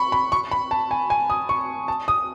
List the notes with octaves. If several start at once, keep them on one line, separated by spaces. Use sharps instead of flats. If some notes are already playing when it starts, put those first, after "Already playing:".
Already playing: B5 C#6
B5
C#6
B5
A5
G#5
G#5
D#6
C#6
A5
D#6